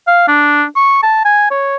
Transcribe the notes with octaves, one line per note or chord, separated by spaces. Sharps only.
F5
D4
C#6
A5
G#5
C#5